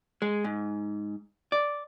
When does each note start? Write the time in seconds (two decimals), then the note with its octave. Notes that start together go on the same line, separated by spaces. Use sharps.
0.22 G#3
0.44 G#2
1.52 D5